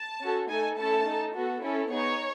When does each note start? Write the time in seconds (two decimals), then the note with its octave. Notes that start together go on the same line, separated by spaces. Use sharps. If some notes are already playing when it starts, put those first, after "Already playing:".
Already playing: A5
0.21 C#4 F#4 A4
0.49 A3 D#4 A4 G#5
0.77 A3 C#4 E4 A4 A5
1.06 D#4 A4
1.33 B3 F#4 A4
1.62 C#4 E4 A4
1.90 B3 D#4 G#4 C#5